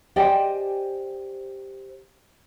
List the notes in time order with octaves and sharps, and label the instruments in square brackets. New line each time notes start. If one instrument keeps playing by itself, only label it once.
[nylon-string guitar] G4 C5 D5 D#5 G5 G#5